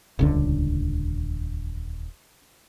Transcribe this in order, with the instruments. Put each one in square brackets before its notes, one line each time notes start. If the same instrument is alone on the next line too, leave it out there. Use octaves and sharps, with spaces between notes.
[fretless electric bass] D#1 C#2 D3